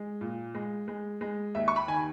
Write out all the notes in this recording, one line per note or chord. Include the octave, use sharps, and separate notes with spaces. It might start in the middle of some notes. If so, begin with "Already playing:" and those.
Already playing: G#3
A#2
G#3
G#3
G#3
D#2 E5
C#6
B5
D#3 G#5